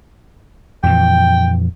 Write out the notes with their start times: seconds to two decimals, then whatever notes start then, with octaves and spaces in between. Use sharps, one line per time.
0.83 F2 A#2 E3 G5